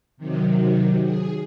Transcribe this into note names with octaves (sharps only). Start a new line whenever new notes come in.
C3 D#3 F#3
G#4